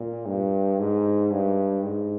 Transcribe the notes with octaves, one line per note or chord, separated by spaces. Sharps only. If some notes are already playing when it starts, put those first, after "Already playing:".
Already playing: A#2
G2
G#2
G2
G#2